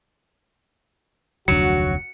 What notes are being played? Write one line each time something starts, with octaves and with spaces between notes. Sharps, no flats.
F1 D2 F#3 D4 F#4 C#7